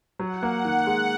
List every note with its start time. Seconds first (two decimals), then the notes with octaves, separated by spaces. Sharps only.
0.19 F#3 F#5
0.42 A#3
0.65 D#3
0.87 G#3